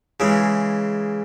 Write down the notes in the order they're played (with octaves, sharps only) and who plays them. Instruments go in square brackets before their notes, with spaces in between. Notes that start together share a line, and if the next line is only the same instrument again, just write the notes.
[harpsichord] C#3 E3 G#3